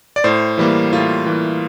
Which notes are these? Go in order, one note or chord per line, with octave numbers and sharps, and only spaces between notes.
D5
A2 C5
E3 G3 A#3
A2 F4
E3 G3 A#3